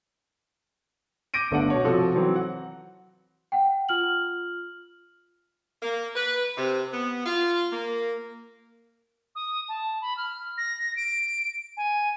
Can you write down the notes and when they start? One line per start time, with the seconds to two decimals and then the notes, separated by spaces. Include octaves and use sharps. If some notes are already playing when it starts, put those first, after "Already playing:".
1.34 D6 G6 A#6 D7 D#7
1.51 G1 A3 B3 D4 F#5
1.70 B2 C#5
1.84 C3 F3 F#4 A4
2.15 E3 F#3 C4
2.36 F#5
3.52 F#5 G5
3.89 F4 F6 F#7
5.82 A#3
6.15 B4
6.57 C3
6.92 B3
7.26 F4
7.71 A#3
9.35 D#6
9.68 A5
10.01 B5
10.17 F6
10.57 A#6
10.96 D7
11.77 G#5